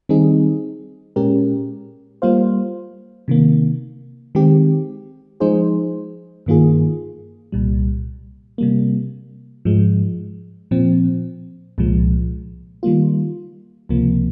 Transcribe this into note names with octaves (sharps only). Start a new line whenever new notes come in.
D#3 G3 C4 D#4 G#4
A#2 G#3 C#4 G4 A#4
G3 A#3 F4 C5 F5
C3 D#3 A#3
D#3 G#3 C4 G4
F3 G#3 D#4 G#4 C5
G2 D#3 A#3 F4 G#4
C2 A#2 G3
C3 G3 A#3
G#2 F3 G#3
A#2 F3 C4
C2 A#2 F3 G#3
D#3 G3 A#3 F4
C#2 C3 F3 A#3